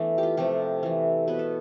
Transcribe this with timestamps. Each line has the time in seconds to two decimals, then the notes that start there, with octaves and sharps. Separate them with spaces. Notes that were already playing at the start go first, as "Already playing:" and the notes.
Already playing: E3 A3 B3 D4
0.18 G4
0.23 F4
0.37 C3 F3 A3 G4
0.83 E3 A3
1.27 B2 B3 B4
1.39 A4